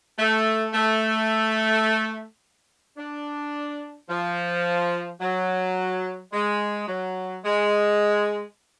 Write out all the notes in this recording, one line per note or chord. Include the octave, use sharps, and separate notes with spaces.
A3
A3
D4
F3
F#3
G#3
F#3
G#3